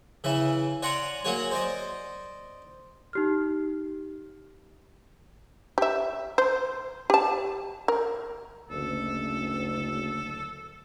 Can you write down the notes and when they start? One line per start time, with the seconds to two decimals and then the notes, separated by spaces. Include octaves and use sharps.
0.24 C#3 E3 E5
0.82 C#5 D5 F#5 G#5 A#5 C6
1.25 F#3 A#3 F#4 G#4 C#5
1.51 C5 D5 D#5
3.13 D#4 G4 F6
5.78 G4 E5
6.38 C5
7.10 G4 A5
7.88 A#4
8.70 F#1 D2 A4